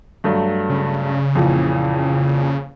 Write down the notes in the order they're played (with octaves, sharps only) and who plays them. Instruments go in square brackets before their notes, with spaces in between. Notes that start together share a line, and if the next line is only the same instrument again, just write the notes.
[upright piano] G2 F#3 A3
[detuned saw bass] C#3
[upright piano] F2 A#2 E3